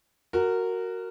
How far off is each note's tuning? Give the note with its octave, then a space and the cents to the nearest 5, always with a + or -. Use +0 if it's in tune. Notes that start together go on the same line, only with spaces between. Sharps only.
F#4 +0 A#4 -15